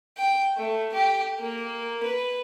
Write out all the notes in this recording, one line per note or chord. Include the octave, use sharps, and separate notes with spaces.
G5
A3
G4
A#3
B4